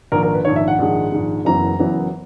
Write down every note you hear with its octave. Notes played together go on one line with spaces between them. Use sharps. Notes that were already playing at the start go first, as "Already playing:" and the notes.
A#1 G#2 D#3 A#4
A#4
B4
A#1 G#2 D#3 C#5
E5
F#5
A#1 G#2 D#3 G#3
A#1 G#2 D#3 G#3
F#1 F#2 E3 B3 A#5
F#1 F#2 E3 B3